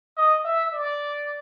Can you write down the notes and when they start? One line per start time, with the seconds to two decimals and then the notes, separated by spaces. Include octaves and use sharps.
0.17 D#5
0.45 E5
0.73 D5